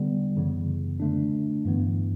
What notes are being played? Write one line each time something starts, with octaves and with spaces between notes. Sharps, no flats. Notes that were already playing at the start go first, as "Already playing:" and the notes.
Already playing: D3 G3 B3
F#2 C#3 E3 B3
D3 A3 D4
G2 E3 B3